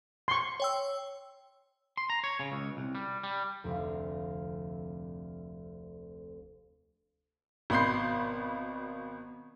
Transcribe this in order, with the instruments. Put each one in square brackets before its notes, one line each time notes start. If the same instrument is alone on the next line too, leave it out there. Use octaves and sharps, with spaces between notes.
[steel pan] C6 C#6
[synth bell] C#5 G5 E6
[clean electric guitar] C6
A#5
C#5
C#3
C#2
C2
G3
G3
[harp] F1 D2 C4 E5 F5
[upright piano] G#1 B2 B5 C6 G6 C7